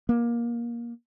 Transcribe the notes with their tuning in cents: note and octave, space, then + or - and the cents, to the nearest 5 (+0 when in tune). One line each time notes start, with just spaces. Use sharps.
A#3 +20